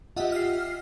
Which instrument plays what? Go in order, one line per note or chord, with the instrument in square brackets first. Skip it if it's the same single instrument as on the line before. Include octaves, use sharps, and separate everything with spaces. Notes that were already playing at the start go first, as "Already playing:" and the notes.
[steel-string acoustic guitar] F4 G4 [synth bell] D#5 E5 F#5
[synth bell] F6 C7